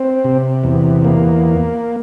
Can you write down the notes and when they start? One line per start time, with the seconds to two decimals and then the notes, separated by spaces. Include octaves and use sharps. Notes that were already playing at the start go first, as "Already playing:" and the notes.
Already playing: C4
0.24 C3
0.64 E2
1.04 A#3